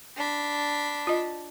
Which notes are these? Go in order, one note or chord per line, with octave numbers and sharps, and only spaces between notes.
D4 B5
F4 D#5